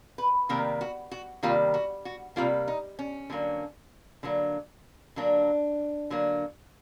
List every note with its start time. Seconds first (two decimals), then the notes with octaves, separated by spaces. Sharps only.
0.18 B4
0.49 C3 D#3 G3 A#3 A#4
0.81 F#4
1.11 F#4
1.43 C3 D#3 G3 A#3 F4
1.74 F#4
2.05 F#4
2.36 C3 D#3 G3 A#3 F4
2.68 D#4
2.99 C#4
3.30 D3 F#3 A#3
4.23 D3 F#3 A#3
5.16 D3 F#3 A#3 D4
6.10 D3 F#3 A#3